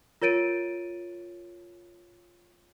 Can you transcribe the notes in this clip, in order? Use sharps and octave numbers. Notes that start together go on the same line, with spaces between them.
F4 A#4 C#5 A6 D7 D#7